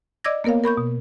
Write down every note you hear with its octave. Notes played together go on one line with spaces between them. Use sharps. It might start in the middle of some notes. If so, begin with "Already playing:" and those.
D5 D#5 D6 E6 G#6 A#6
A#3 B3 A#4 C#5 F5
A#4 B5 C#6 G6
B2